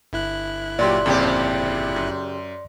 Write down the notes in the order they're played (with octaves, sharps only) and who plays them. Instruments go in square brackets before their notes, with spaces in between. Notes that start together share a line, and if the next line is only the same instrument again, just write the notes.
[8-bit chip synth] G1 E4 F#6
[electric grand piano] A#2 F#3 G4 [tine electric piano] D5 C6
[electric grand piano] F2 A#2 C4 [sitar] C#3 G4
[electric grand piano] F#2